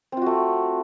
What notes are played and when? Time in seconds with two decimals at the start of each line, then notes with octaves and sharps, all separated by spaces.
0.12 C4
0.17 F4
0.22 F#4
0.26 A3